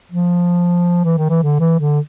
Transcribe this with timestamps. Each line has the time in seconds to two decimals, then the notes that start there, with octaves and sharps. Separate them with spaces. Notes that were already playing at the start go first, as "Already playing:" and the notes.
0.12 F3
1.05 E3
1.18 D#3
1.30 E3
1.43 D3
1.60 E3
1.80 D3